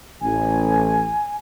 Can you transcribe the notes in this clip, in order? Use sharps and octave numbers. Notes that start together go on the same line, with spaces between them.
A1 G#5